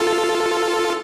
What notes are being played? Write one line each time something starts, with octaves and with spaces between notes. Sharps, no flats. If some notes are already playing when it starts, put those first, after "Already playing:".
Already playing: F4 A4